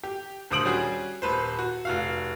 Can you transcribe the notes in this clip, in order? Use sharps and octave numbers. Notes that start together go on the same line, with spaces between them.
G4
D#1 D2 C5 D#6 D7 F#7
G3 C#4 F#4 G#4
D#1 B4 C5
F#4
F1 F#4 F5